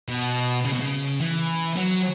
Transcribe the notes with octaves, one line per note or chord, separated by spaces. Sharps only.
B2
C#3
B2
C#3
E3
F#3